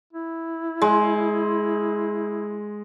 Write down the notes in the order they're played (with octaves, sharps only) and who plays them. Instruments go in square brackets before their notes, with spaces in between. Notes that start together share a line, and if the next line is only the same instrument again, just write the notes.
[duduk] E4
[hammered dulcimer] G#3